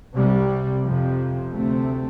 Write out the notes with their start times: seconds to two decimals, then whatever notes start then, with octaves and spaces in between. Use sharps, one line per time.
0.14 C2 C3 G3
0.83 F2 C3 F3
1.52 D2 C3 A3 C4